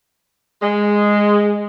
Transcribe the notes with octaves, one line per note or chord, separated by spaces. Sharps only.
G#3